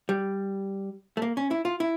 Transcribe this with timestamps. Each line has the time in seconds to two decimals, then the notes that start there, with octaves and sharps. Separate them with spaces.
0.09 G3
1.17 A3
1.22 A#3
1.37 C#4
1.51 E4
1.65 F4
1.80 E4